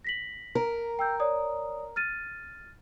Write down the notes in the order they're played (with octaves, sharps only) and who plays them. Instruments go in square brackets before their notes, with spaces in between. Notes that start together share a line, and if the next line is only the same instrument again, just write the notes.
[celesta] A#6 B6 F#7
[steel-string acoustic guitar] A#4
[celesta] G5 E6 G6
C#5 D5 D#6
F6 A6 D#7